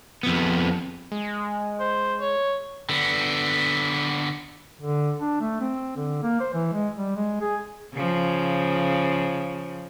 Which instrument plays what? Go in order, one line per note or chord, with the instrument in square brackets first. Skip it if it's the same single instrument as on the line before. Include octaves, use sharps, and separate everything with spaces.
[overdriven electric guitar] F2 B3
[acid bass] G#3
[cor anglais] C5
C#5
[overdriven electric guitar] D3 B3
[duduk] D3
D4
A3
C4
D3
A#3
C5
E3
G#3
G3
G#3
G#4
[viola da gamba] C#3 F3